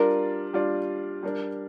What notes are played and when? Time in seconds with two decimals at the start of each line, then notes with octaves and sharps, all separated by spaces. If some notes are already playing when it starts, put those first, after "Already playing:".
Already playing: G3 D4 F4 A#4 D5
0.53 G3 D4 F4 D5
1.23 G3 D4 A#4 D5